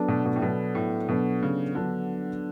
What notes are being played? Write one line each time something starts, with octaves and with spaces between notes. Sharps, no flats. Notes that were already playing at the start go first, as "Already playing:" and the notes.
Already playing: F#3 B3 D4 A4
B2
B2
A2
B2 F#3 B3 D4 A4
A2
B2 F#3 B3 D4 A4
C#3
D3 F#3 B3 D4 A4